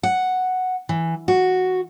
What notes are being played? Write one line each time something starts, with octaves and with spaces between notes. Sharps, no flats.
F#5
E3
F#4